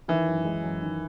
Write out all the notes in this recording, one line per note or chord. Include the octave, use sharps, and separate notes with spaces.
D#3 E3
F#2
G#3
F#2
D#3